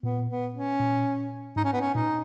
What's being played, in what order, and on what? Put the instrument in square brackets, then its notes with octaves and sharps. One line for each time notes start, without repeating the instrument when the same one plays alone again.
[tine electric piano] A#2 [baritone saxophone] B3
[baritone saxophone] B3
C#4
[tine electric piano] A#2
[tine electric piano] G#2 [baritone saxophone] D#4
[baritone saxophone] C#4
B3
C#4
[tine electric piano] A#2 [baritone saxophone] D#4